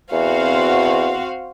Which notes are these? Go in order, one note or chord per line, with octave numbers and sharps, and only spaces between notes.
E2 C4 F#4 F5